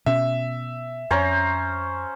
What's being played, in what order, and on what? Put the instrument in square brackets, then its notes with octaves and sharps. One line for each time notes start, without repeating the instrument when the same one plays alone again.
[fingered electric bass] B2 C#4 [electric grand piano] E5
[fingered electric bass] F2 [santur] C#4 C5 A#5